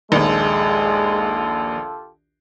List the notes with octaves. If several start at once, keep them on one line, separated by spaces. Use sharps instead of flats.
A#1 D#2 G#3 F4 G4 A4